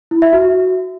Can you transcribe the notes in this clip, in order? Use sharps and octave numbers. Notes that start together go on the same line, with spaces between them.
E4
E5
F#4